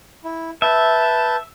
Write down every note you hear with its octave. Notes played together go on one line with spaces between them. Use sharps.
E4
B4 E5 A5 G6